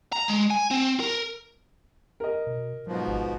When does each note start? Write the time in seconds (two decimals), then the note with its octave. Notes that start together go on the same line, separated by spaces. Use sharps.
0.12 A#5
0.28 G#3
0.50 G#5
0.71 C4
1.00 A#4
2.20 A#4 D#5
2.47 B2
2.87 G#2 B2 F3 F#3
3.08 G#1